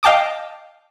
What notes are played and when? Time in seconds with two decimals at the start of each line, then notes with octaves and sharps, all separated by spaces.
0.03 D#5 F5 G5 A5 D6 D#6